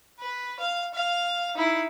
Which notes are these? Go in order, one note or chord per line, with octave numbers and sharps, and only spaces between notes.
B4
F5
F5
D#4 E4